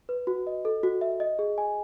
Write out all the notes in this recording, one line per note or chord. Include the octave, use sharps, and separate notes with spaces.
B4
F#4
D#5
A4
F#4
E5
D#5
G#4
G#5